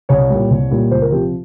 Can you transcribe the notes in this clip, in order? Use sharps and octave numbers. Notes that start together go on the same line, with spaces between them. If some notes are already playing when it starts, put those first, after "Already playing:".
C2 C#5
A#2 G3
C2
A#2 G3
C#2 C5
A#4
C3 F3 G4